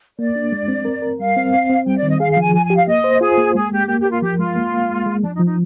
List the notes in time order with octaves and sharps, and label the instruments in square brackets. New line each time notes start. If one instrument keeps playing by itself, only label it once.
[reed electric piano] A#3 [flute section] D5
[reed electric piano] D4
G#3
C4
A#4
A#4
[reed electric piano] G3 [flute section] F5
[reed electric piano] C4
C4
C4
[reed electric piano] G3 [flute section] G5
[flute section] D5
[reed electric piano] D#3
[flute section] D#5
[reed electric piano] G#4 [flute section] F5
[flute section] F5
[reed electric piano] F3
[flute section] G#5
[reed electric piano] F3 [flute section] G#5
[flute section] G#5
[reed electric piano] G4
[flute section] F5
[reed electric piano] A#3 [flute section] D#5
[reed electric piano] C5
[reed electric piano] F4 [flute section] G#4
[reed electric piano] A#3
[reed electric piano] G#3 [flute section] G#4
[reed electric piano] G#3 [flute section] G4
[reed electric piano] A#3 [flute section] G4
[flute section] G4 [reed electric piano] A#4
[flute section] F4
[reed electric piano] F3 [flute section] G4
[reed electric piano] G#3 [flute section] F4
[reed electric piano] A#3
A#3
G#3
G#3
[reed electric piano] F3 [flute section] D4
[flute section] D#4
[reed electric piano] F3
[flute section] D#4